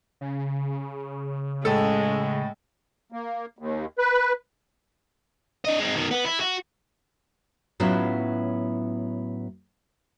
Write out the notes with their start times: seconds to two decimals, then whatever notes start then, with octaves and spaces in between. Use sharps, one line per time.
0.21 C#3
1.65 A2 G#3 A4
3.12 A#3
3.59 D#2
3.98 B4
5.65 D4 D#5
5.79 G#3 C4
5.95 B2 D#3
6.11 B3
6.25 E4
6.40 F#4
7.80 A2 F#3 B3 C#4 E4 F4